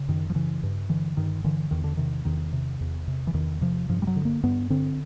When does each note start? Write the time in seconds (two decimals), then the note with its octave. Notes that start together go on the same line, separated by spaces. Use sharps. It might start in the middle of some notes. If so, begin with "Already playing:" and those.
Already playing: C#3
0.08 F#2 D#3
0.30 F3
0.35 C#3 E3
0.63 G2
0.89 D3 E3
1.17 G2 D#3
1.44 D3 E3
1.71 E2 D#3
1.84 D3
1.97 C3 D#3
2.25 E2 D#3
2.53 C3
2.81 E2
3.08 C3
3.27 E3
3.34 E2 D#3
3.61 C3 F3
3.89 G2 F3
4.02 G3
4.07 F#3
4.16 D3
4.25 A#3
4.43 G2 B3
4.70 D3 C4